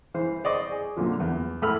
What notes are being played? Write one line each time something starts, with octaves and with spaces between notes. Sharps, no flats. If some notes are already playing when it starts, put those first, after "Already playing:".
E3 C5
C5 D5 D#5 C#6
G#4
F#2 A#2 D3 F3
E2
A2 A4 B5 F6